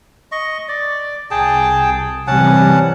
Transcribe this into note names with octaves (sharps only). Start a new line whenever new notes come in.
D#5 C#6
D5
C2 G#4 G5 A5
C3 E3 G3 C#4 F#5 A5